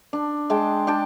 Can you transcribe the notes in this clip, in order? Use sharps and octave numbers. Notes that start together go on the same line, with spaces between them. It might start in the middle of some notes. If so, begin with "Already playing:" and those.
D4
G#3 G5 A5
D4 G5 A5